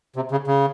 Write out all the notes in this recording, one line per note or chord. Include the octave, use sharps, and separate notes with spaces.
C3
C#3
C#3